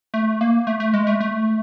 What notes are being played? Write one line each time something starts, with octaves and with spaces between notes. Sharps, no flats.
A3
A#3
A3
A3
G#3
A3
A3